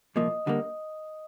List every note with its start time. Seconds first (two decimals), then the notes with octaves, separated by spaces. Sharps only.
0.16 C2 A#2 F3 A#3 D#5 D#6
0.47 D3 G3 A#3